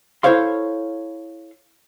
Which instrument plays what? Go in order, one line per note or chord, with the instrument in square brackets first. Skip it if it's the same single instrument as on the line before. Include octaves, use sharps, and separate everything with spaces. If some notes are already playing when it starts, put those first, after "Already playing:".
[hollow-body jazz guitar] E4 A4 C5 C#5 F5 C6